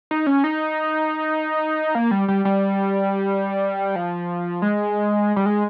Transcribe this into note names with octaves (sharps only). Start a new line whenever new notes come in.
D#4
C#4
D#4
A#3
G3
G3
G3
F3
G#3
G3
G#3